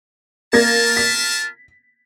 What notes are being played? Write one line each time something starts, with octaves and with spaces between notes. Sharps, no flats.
A#3 F4 A#4 A5 G#6 A#6
B6